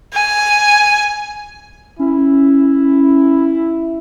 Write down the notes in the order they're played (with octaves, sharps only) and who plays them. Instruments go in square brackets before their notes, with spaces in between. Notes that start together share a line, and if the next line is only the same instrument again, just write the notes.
[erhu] G#5
[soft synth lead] C#4 [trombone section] E4